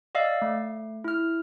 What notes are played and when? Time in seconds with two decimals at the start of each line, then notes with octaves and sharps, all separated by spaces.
0.15 D5 D#5 F5 E6
0.42 A3
1.04 E4 F6